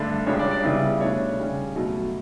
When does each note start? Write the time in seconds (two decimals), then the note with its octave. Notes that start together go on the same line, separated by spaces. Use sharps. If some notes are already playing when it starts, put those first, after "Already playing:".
Already playing: G2 D3 A3 D4 D5
0.27 C#2 C#3 G3 D4 C#5
0.39 D5
0.51 D5
0.64 C#3 G3 B3 E4
1.00 B2 A3 D4 C#5
1.38 C#3 G3 C#4
1.75 B2 F#3 A3